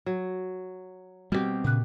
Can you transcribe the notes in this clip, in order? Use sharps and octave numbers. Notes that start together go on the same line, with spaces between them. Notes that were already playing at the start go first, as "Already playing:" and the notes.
F#3
B2 G3 G#3 C4 G4
A#2 C#3 F#6